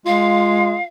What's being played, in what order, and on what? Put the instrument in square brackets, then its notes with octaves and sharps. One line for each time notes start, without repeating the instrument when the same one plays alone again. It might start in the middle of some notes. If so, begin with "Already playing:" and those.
[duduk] G#3 [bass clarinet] F4 [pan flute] F5